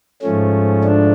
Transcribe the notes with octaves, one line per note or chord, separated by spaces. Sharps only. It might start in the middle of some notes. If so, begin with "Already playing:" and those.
G#2 F3 A3 C#4
D4